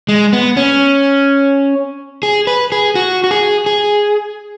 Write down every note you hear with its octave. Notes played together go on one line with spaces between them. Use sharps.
G#3
B3
C#4
G#4
B4
G#4
F#4
F#4
G#4
G#4